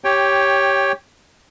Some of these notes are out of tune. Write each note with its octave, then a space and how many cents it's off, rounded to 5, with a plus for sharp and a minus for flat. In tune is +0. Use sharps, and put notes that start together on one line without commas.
G4 +0 C#5 +0 G5 +15